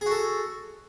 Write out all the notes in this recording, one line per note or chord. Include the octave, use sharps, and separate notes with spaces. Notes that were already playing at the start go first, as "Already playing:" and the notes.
F#4 G#4 A4